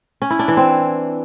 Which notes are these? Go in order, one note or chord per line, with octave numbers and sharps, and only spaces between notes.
C#4
E4
D4
E3
C4